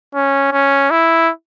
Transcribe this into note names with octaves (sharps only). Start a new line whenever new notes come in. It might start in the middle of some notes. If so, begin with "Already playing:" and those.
C#4
C#4
E4